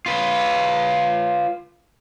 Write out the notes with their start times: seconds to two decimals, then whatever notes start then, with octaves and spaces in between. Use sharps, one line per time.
0.06 F4 B4